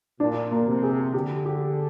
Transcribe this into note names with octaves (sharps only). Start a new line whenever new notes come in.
A#2 D4
A#3
C3
G#4
D3 G4
G4